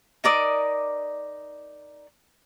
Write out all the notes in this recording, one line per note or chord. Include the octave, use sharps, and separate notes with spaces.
D#4 A#4 D5 D#6